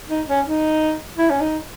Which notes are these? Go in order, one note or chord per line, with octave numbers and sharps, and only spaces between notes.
D#4
C#4
D#4
E4
C#4
D#4